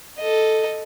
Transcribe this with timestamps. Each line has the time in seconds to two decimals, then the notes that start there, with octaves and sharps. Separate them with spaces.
0.18 A4 D#5